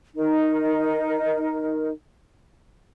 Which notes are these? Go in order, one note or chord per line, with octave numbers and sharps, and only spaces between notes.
D#4 A#4